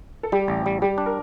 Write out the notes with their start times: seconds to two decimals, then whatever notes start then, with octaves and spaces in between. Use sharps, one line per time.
0.23 A4
0.32 G3 G4
0.48 A1
0.66 G3
0.82 G3 G4
0.98 D4
1.06 A#4